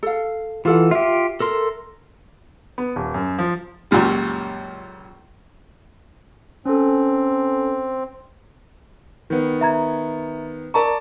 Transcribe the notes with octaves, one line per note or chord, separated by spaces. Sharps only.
A4 F5
E3 F4 A4 F#5
F4 G4 E5
A4 A#4 C6
B3
D#1
F#2
F3
C#2 F#2 A#2 G3
C4 C#4 A4
D#3 B3
E5 A#5 G#6
A#4 D5 A5 A#5 C#6